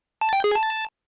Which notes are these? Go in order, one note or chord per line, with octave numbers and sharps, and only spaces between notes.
A5
G5
G#4
A5